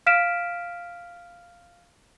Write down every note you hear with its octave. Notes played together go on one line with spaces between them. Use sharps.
F5 F6 B6 D7 E7